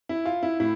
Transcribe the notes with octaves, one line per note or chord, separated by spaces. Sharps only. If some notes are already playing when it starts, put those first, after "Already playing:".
E4
F4
E4
A2 E4